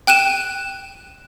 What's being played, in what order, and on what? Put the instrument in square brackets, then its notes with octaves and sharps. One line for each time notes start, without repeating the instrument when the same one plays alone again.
[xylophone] G5 F#6 D#7 E7